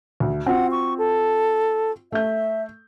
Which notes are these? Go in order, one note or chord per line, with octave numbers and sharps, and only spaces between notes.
D2
C4 F4 F#4 F#5
C#6
A4
A3 E5 G6